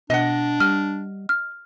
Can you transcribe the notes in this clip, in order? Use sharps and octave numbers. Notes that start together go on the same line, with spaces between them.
B2 D4 D#5 F#5
G3 F6
F6